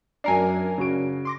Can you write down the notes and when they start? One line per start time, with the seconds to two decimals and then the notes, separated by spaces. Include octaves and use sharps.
0.24 F#2 D4 A#4 G#5 C7
0.78 C#3 F#4 D7
1.25 C6 D6 A#6